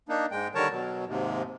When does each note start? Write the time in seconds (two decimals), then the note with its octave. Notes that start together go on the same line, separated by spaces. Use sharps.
0.09 A#3 D4 D#4
0.31 G#2 G#3 G5
0.55 D3 D#3 G3 A#4 C#5 A5
0.70 B2 F#3
1.07 D#2 G#2 C3